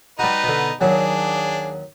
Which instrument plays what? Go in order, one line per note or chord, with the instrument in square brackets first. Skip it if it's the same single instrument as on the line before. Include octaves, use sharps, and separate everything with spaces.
[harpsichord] G3 F#4 [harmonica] D#4 B4
[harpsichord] B2 D3
[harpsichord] D#2 F#3 [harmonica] D4 G#4